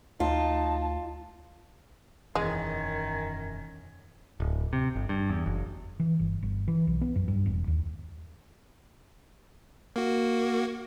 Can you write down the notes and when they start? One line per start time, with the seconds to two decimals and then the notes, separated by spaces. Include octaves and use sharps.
0.20 D2 D#4 F4 A5
2.35 E1 F#2 D#3 E3 G#3 C#4
4.40 D1
4.73 C3
4.96 G1
5.09 G2
5.30 E2
5.46 F#1
6.00 E3
6.19 G1
6.43 G1
6.68 E3
6.87 B1
7.01 B3
7.16 F#2
7.28 G2
7.46 E1
7.68 D#2
9.96 A#3 F#4